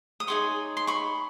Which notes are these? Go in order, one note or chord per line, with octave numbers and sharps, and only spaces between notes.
D#6
D#4 G#4 C#5 C6 D6
C6
B5 C#6